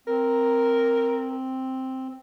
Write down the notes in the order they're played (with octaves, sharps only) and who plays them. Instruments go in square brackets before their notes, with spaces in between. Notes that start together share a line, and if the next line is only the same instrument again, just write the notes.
[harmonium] C4 [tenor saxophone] A#4